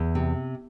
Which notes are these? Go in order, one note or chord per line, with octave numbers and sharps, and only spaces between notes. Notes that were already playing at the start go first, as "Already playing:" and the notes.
Already playing: E2
C3